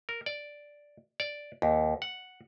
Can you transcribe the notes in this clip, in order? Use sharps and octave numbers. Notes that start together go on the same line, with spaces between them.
A#4
D5
D5
D#2
F#5